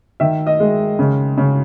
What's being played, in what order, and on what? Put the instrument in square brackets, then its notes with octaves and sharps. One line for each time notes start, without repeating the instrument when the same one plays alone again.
[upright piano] D#3 E5
D#5
G#3
C#3
C#3